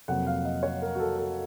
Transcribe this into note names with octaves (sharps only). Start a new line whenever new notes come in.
F2 C3 F#3 A#3 F#5
F5
D#5
C#5
A#4
F#4
A4
A4